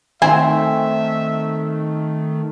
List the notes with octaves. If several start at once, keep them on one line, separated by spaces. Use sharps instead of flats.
D#3 A3 C4 C5 E5 G#5